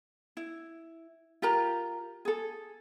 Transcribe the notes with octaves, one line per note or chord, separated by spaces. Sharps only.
E4
F4 G4 A#4 A#5
G#4 A4